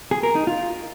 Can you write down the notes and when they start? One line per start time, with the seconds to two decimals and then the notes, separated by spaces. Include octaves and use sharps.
0.11 G#4
0.23 A#4
0.35 D#4
0.47 F4